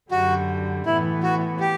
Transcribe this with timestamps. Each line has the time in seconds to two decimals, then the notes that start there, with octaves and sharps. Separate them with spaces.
0.11 F#2 D3 G3 F#4
0.86 A2 E3 B3 E4
1.23 F#4
1.60 G4